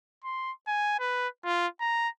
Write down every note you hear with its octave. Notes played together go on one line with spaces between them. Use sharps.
C6
G#5
B4
F4
A#5